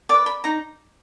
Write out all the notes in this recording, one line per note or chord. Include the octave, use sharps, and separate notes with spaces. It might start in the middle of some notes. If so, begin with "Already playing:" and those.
B4 D5 D6
B5
D#4 A#5